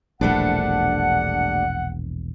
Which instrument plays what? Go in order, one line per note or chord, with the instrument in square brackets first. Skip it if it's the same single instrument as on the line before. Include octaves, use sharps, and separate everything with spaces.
[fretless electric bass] E1 A#1 [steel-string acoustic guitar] G3 A3 D4 [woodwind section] F#5